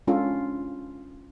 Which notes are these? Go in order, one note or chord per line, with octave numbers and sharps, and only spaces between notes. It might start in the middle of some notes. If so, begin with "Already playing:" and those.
G#3 C#4 D4 F4 A4